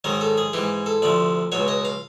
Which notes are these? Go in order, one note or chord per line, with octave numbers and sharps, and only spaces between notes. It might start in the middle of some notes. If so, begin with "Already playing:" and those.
G#2 D#3 F#3 A#4
A4
G#4
G#2 E3 G4
A4
D2 C3 F3 D5
C#2 B2 F#3 C#5
D#5
F5